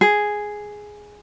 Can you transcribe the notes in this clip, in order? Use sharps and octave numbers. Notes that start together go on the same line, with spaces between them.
G#4